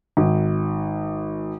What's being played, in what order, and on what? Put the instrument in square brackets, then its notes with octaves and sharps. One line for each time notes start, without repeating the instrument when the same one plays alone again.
[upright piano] G#1